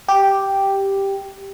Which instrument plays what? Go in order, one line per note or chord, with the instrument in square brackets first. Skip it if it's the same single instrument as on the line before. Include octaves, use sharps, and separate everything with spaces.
[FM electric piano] G4